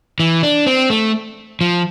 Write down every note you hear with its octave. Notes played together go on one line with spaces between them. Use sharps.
E3
D4
C4
A3
F3